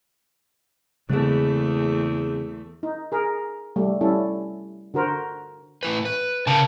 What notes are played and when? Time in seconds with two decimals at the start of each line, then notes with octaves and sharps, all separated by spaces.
1.09 E2 C#3 G#3 A3 B3 C4 G#4
2.83 D#4
3.12 G#4 A#4
3.76 G3 A3
4.01 G3 C#4 E4 A4
4.94 D3 F#4 A#4 C5
5.83 A2 E4 B4
6.05 B4
6.47 C#3 A#4 C#5 A5